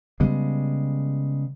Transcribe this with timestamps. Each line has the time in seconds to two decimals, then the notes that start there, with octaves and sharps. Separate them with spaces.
0.20 C#3 G3 G#3 B3